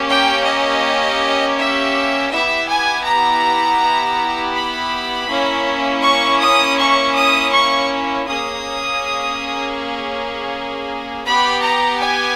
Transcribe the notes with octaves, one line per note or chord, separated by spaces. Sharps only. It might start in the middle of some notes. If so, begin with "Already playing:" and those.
Already playing: A#3 C#4 G4
G5
D#5
E5
B3 E4 G4 E5
G#5
A#5
B5
A#3 C#4 E4
C#6
D#6
C#6
D#6
C#6
A#3 C#4 G#4 D#6
B3 G4 B5
A#5
G#5